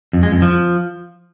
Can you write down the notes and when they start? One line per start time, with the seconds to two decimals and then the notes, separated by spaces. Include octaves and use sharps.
0.13 F2
0.23 G#3
0.33 F2
0.42 F3